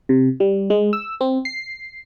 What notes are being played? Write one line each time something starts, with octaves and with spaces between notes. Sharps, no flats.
C3
G3
G#3
E6
C4
C7